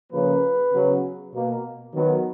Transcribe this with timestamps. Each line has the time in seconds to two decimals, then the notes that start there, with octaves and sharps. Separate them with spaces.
0.12 C#3 F3 A#3 B4
0.73 C#3 F#3 B3
1.32 B2 A#3
1.93 D#3 F#3 B3